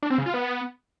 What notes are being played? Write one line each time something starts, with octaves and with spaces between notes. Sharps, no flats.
D4
C4
C#3
F4
B3